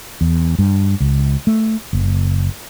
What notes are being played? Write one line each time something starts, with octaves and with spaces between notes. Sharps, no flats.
E2
G2
C#2
A3
F#1